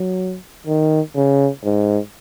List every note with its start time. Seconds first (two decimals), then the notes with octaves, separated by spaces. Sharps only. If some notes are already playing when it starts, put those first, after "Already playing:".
Already playing: F#3
0.67 D#3
1.15 C#3
1.64 G#2